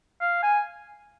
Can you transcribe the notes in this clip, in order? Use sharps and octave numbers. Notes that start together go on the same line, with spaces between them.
F5
G#5